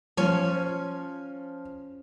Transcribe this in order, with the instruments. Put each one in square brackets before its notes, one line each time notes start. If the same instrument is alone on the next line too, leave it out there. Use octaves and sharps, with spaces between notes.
[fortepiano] F3 [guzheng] C#4 C#5